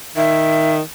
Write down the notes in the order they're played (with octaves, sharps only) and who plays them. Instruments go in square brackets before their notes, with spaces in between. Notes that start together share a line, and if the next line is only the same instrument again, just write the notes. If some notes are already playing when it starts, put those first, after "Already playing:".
[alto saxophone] D#3 [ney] E5